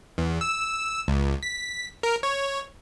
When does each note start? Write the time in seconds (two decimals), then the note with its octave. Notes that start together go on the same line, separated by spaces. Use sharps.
0.18 E2
0.41 E6
1.08 C#2
1.43 B6
2.03 A#4
2.23 C#5